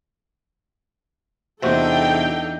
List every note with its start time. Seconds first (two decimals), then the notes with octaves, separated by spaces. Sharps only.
1.62 E2 C3 C4 D4 D#4 F#4 A4 G5